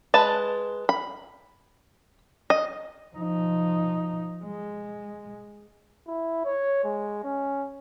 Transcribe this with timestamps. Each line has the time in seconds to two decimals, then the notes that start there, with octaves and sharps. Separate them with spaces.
0.14 G#3 B4 A5
0.89 B5
2.50 D#5
3.15 F3 D#4
4.44 G#3
6.07 E4
6.45 C#5
6.84 G#3
7.24 C#4